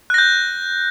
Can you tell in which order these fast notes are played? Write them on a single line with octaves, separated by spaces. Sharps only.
F#6 A#6 G6